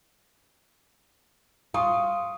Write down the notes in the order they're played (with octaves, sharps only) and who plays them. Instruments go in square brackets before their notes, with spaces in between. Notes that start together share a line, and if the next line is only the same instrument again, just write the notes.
[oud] F4 [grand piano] C#6 D#6